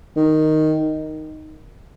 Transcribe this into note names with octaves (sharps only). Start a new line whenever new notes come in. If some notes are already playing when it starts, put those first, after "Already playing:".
D#3